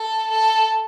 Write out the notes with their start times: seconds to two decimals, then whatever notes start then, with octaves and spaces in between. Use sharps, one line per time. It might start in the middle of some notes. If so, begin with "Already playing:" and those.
Already playing: A4
0.30 A4